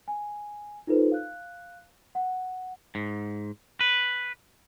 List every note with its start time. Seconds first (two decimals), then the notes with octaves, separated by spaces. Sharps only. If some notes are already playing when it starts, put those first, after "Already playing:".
0.08 G#5
0.87 D#4 F4 A4 B4 C5
1.12 F5 F#6
2.15 F#5
2.95 G#2
3.81 B4